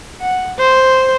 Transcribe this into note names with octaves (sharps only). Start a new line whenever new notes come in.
F#5
C5